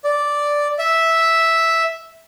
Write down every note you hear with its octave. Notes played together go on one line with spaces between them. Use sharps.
D5
E5